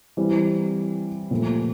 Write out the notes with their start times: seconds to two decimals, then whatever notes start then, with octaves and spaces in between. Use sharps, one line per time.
0.17 E3 G3 C4
1.31 A#2 F3 A3